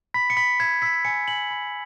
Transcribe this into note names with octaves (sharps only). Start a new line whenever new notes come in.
B5 B6
C#7
B5 B6
B5 G#6
E6 B6
G#5 C#7
G#5 F#7
B5